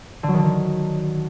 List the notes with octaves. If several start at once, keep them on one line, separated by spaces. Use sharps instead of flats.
D3
F#3
D#3
D3
D#3